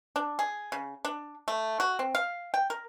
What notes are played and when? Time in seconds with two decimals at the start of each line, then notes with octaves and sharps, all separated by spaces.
0.16 D4
0.39 G#4
0.72 C#3
1.05 D4
1.48 A3
1.80 F#4
1.99 C4
2.15 F5
2.54 G5
2.70 A#4